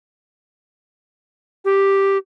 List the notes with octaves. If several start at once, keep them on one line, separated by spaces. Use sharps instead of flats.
G4